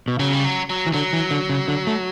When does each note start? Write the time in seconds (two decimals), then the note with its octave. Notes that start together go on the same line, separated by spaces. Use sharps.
0.08 B2
0.19 C#3 F#3
0.33 G3
0.45 F#3
0.70 F#3
0.87 E3
0.93 D3 F#3
1.13 E3
1.31 D3
1.49 C#3
1.68 D3
1.87 A3